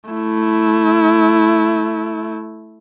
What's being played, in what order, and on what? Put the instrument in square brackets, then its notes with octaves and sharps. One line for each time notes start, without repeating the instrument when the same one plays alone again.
[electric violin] A3 E4